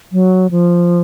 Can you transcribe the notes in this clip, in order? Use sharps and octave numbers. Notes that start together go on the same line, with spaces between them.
F#3
F3